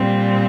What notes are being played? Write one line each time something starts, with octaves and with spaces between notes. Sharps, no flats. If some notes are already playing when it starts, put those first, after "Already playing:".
Already playing: A#2 G3 C4